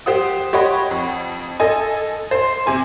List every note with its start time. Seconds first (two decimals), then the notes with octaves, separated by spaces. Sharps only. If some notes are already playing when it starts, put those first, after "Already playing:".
0.06 G4 C5 F#5 D#6
0.53 G4 C#5 D#5 F#5 B5
0.91 F2
1.60 A4 D#5 G#5
2.31 C5 C6
2.66 C3 G#5 C6